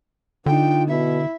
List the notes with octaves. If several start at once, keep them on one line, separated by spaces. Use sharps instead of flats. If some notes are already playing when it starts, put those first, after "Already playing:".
D3 D4 D#4 F4 G5
B2 E4 E5